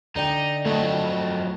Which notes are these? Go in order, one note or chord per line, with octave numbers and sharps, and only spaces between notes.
D3 D#4 D5 G5
F2 F#3 A3 D#5